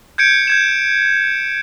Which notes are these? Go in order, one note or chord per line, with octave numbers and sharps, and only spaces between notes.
G6 G#6 C#7 D7
G6 G#6 E7